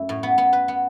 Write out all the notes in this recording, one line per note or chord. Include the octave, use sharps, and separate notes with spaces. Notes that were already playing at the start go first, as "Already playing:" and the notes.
Already playing: F#2 A3 E4
A2
B3
B3
B4
B3